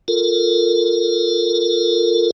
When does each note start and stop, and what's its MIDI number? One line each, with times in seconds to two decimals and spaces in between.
0.08 2.31 65
0.08 2.31 69
0.08 2.31 70